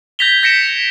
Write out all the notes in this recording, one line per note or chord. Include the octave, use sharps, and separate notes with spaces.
G6 G#6 A#6 B6 F7 G7
G6 A#6 B6 C#7 D7 E7